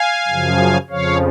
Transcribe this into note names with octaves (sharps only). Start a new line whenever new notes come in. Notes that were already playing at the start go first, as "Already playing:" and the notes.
Already playing: F5 G#5
F#2 C#3 F3
F2 C#3 F3 C#5 F5